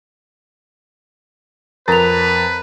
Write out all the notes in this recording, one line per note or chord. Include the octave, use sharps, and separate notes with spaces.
F2 A#4 B4 A#5 A6 F7